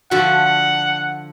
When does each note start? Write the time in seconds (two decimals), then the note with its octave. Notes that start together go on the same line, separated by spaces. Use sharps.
0.11 D3 F3 F#4 F#5 A5 B5